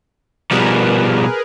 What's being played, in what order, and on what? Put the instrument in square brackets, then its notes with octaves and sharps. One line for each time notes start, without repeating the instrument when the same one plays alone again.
[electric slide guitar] B2 F3 G3 [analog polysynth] G#4 A#4 B4